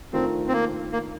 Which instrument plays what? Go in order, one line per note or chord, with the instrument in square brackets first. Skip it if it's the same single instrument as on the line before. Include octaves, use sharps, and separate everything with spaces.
[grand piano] D#3 A3 D4 F4 A#4 [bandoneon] C4
[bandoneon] C4
A#3
A#3